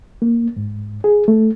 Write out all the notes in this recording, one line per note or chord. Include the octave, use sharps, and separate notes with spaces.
A#3
G#2
G#4
A3